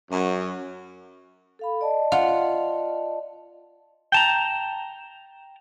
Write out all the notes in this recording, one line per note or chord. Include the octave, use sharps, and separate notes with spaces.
F#2
A4 F5 B5
D5 D#5 A5
F4 F#5
G5 A5 A#5